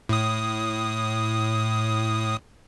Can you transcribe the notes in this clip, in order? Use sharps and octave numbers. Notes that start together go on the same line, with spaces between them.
A2 D#6